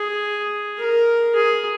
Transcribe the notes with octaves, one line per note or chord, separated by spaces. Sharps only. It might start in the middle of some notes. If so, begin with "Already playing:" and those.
Already playing: G#4
A#4
G#4